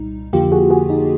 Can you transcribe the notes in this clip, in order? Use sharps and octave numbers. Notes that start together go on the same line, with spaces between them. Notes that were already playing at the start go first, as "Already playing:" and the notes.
Already playing: C2 A#2 G3 D#4
F2 D3 F3 A#3 F4 G4
F#4 G#4
F#4 G#4
D#4